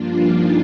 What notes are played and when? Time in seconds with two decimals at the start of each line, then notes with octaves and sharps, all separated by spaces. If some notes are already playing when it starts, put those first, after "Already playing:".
Already playing: G2 F3 A#3 D4 F4
0.30 D#4